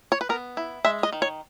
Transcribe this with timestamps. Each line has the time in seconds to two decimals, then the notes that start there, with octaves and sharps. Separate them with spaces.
0.12 C#5
0.21 B4
0.29 B3 A#4
0.57 E4
0.85 G#3 E5
1.03 D#5
1.13 D#3
1.22 C#5